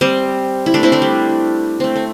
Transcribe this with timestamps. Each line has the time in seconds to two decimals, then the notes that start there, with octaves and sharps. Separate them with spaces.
0.01 G3 C4
0.66 E4
0.74 A3 D4
0.83 C4 E4
0.92 A3 D4
1.02 G3
1.80 A3 C4
1.96 A3